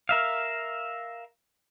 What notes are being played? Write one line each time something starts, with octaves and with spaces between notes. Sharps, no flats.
A#4 E5 F5